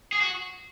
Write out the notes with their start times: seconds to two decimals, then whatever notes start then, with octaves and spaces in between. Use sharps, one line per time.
0.12 G#4
0.21 F#4